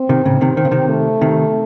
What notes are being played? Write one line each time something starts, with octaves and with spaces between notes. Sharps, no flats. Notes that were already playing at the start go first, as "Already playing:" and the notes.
Already playing: C4
C3 D#3
A2 C#3
C3 D#3
D#3 C4
C#3
C3 D#3
A3
C3 D#3